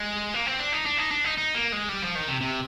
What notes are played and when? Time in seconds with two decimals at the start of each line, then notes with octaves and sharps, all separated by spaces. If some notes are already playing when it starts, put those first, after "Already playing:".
Already playing: G#3
0.34 A#3
0.47 C4
0.60 D4
0.73 D#4
0.86 D4
0.98 D#4
1.11 D4
1.25 D#4
1.37 D#4
1.54 A#3
1.72 G#3
1.89 G3
2.02 F3
2.15 D#3
2.28 C3
2.41 C3